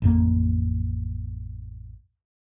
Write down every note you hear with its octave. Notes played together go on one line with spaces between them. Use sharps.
A1 F2 A#3